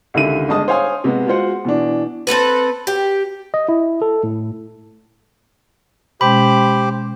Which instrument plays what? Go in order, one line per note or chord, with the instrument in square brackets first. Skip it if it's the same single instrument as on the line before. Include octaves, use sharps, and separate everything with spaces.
[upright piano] C#2 D3 D#3 G4 E5 D#7
G1 G#3 D#5 A5 D#6
C5 C#5 F5 G#5 D#6
C3 G#3 B3
G#3 F4 F#4 C5 F#5
B2 E3 D4
[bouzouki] C4 C#4 A4 B4
G4
[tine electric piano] D#5
E4
A4
A2
[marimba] B2 G#3 C#4 [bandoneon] G4 C5 D6 [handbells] B5